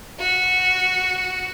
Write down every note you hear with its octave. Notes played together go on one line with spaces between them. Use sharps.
F#4